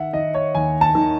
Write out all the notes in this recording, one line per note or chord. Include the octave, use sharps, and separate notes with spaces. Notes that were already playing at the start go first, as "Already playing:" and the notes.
Already playing: D#3 E5 F#5
D#3 D#5
C#5
D#2 G#5
A5
D#3